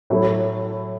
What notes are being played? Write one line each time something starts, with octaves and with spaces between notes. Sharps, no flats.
A2 F#3 A3 E4